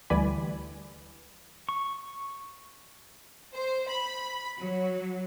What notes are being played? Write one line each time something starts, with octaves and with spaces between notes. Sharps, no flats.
D2 E3 G3 D5 G#5 B5
C#6
C5
B5
F#3